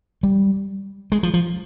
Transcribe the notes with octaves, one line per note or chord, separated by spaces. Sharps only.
G3
G#3
F3
F3